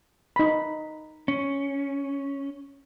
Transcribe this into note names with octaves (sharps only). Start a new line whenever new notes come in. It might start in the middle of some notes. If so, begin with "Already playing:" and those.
D#4 B5
C#4